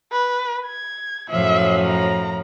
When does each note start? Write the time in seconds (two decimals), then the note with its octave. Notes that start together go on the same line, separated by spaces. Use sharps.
0.12 B4
0.67 G#6
1.30 F#2 A2 F3 E5
1.86 A#5